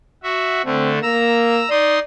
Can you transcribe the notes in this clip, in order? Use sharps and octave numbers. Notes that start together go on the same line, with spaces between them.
F#4 E5
D3 A3 C4
A#3 A#5 E6
D#4 D5 C6 D#6